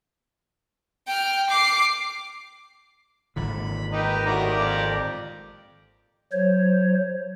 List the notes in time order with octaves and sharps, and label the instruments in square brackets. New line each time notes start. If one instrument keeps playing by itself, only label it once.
[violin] G5 F6
D6 C7
[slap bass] G#1 A#2 D3 [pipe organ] B5
[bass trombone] D#3 [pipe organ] D#4 G4 B4 [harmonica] D#5 A#5
[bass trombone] A2 [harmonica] D#3 F#4 D5 [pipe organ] G4 A#4 A#5
[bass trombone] F2 [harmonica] D5
[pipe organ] F#3 C5 C#5